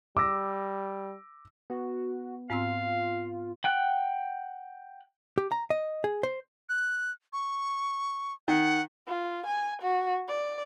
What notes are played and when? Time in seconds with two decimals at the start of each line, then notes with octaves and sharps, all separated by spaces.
0.17 G3 D6 E6 A#6
1.70 B3 F#4
2.50 G#2 C4 F4 F5 E6
3.64 F#5 G5 F#6
5.38 G4
5.52 A#5
5.70 D#5
6.04 G#4
6.23 C5
6.69 F#6
7.33 C#6
8.48 D#3 F#5
9.08 F4
9.47 G#5
9.82 F#4
10.29 D5